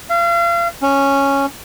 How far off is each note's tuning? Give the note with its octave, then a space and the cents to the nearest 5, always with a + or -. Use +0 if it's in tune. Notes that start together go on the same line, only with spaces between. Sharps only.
F5 -35
C#4 -5